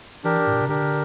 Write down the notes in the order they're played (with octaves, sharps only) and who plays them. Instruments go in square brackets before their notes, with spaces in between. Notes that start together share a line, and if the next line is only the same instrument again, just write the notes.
[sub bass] E3 [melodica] D4 G4 A#4
[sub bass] A2
A#2
C3
[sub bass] D3 [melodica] D4 G4 A#4